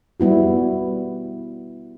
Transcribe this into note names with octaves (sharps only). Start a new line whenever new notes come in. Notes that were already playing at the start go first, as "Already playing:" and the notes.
G3 B3 E4 F#4